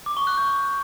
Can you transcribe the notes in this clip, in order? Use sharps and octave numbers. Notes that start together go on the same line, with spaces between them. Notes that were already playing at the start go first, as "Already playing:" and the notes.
D6
C#6
F#6
G6